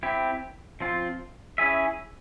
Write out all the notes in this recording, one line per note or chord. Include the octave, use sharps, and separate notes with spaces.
C4 E4 G4
F3 C4 F4
C#4 E4 G#4 E5